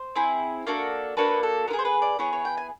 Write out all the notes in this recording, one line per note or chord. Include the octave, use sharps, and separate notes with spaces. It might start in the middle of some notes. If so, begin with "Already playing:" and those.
Already playing: C5
C4 E4 G#4
A#3 D4 F#4 A4
A#3 D4 F#4 A4 B4
A4
B3 E4 A#4
G#4
C5
B4
D5
B3 E4 G#4 C#5
C#5
G5
G#5